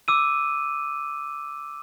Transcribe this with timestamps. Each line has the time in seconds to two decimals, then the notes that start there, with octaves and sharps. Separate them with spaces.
0.08 D6 E6 D#7